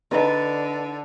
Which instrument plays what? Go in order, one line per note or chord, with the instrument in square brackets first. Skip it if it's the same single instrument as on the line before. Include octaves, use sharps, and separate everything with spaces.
[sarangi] D3 [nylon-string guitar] D#4 B4